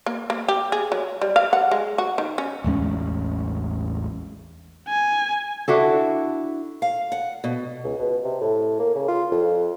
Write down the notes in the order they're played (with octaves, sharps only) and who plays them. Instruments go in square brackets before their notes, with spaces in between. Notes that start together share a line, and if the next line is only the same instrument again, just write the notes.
[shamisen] A#3
A#3
G4
G#4
F#3
G3
F5
F#5
G#3
F#4
D#3
C#4
[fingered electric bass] A1 E2 G#3 C#4
[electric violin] G#5
[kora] D4 E4 F#4 A4
[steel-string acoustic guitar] F5
F#5
B2
[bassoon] C#2
B2
C3
A2
A#3
C#3
F4
F2